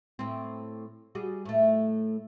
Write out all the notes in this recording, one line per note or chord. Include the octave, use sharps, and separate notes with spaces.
A2 C4
G3 F#4 G#4
A2 A3